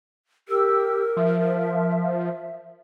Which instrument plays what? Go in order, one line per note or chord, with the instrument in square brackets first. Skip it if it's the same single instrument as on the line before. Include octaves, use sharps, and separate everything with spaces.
[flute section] G4 E6 [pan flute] A#4
[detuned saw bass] F3 [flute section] E5